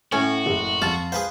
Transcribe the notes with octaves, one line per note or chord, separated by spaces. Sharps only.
A2 C#4 F#4
F#1
F2 F4 A5
G#4 B4 C5 F5